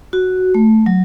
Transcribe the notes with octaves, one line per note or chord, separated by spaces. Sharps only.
F#4
A3
F#3